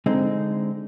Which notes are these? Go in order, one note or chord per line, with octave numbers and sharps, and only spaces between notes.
D3 G#3 C4 D#4